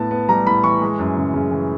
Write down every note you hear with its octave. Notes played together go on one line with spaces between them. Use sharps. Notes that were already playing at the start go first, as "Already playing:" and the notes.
Already playing: A2 B3 A5
B3
G3 A#5
A2 B5
E3 C#6
G#3
F#2
C#3
C#3
E3